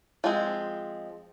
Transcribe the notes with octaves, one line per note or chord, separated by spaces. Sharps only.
F3 G#3 C4